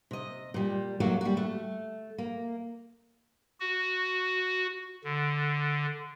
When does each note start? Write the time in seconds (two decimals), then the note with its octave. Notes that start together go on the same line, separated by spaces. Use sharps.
0.11 C3 D#5
0.54 A#2 G3
1.00 F#3 A3 A#3 F#4
1.21 G3 F#4
1.37 A3
2.18 A#3
3.60 F#4
5.04 D3